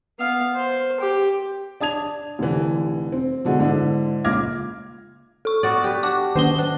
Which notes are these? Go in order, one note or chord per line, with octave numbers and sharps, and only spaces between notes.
B3 F5
C5
G4
D4 A5 D#6 G#6 F7
F1 D3 E3
C4
B2 D3 G#3 F#4
G#2 D3 D4 E4
C#2 A#2 D6 F6 G#6 A#6
A4 C#6
B3 F#4 D5
G4 B4
D4 F#4 D6
D#3 A#3 C5 D#5 G7
D4